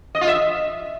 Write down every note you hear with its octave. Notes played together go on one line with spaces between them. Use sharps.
D#5
F4
E5